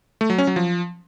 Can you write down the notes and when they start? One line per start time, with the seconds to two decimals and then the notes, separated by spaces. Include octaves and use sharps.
0.21 A3
0.30 F#3
0.38 C#4
0.47 F#3
0.56 F3